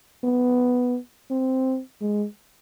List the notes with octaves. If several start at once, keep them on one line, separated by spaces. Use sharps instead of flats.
B3
C4
G#3